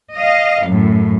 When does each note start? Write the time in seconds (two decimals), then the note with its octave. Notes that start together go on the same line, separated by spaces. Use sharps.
0.15 D#5 F5
0.64 F#2 A2